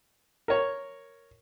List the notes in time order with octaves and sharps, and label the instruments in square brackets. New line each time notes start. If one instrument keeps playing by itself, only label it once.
[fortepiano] A#4 C#5